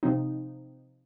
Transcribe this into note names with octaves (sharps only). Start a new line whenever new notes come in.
C3 F3 C4 D#4